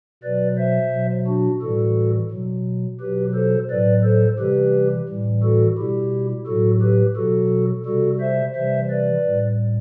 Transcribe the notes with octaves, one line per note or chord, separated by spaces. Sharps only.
B2 F#3 B4 D5
C5 E5
B2 F#3
D4 F#4
A2 E3 G3 F#4 A4
B2 F#3
B2 F#3 G4 B4
A4 C5
A2 F#3 B4 D5
A4 C5
C3 E3 G3 G4 B4
A2 E3 G3
F#4 A4
B2 G3 E4 G4
A2 F#3 F#4 A4
G4 B4
B2 F#3 F#4 A4
C3 G3 F#4 A4
C5 E5
C3 E3 G3 C5 E5
B4 D5
A2 G3